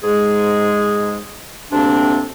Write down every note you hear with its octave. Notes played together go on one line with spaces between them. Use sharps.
G#2 G#3 G#4
D2 C3 A#3 C4 D4